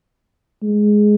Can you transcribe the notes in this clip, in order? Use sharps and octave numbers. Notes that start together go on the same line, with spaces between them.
G#3